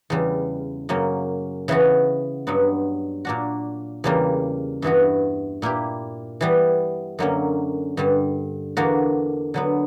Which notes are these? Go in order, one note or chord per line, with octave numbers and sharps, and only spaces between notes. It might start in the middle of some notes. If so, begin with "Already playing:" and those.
E2 C#3 G3
F#2 C#3 F#3 A#3 C#4
C#3 E3 B3 F#4
G2 F#3 B3
A#2 A#3 D4 F#4
E2 C#3 G3 A#3
G2 E3 B3 F#4
A#2 A#3 E4 G4
E3 G3 B3
F#2 D3 F#3 A#3 C#4
G2 D3 G3
E2 D3 A#3 D4 F#4
D3 F#3 B3